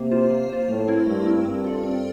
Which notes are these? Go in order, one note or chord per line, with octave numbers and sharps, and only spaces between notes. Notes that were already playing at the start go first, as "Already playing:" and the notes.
Already playing: C3 A#3
F4 C5
A#3
F4 C5
A2 A3
C4 E4 A#4
G2 A3
C4 E4 A#4
G2 C4
F4 A4 D5
C4